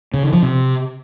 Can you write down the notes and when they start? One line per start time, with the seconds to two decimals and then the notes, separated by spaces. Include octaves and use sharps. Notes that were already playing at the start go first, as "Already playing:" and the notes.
0.14 C#3
0.23 D#3
0.33 F3
0.43 C3